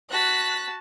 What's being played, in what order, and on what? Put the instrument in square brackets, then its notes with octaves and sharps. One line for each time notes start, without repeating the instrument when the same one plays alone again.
[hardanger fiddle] F#4 A5 [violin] F#6 B6